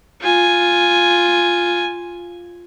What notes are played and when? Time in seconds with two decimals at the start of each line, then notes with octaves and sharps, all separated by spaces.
0.21 F4 G#5